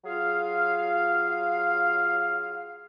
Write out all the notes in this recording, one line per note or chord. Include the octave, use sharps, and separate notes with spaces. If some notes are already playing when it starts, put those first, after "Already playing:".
F#3 F4 G#4 F5